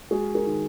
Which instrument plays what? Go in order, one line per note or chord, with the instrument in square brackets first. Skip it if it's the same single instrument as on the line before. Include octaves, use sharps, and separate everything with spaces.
[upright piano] G#3 F#4 G#4
G#4 A#4
D#3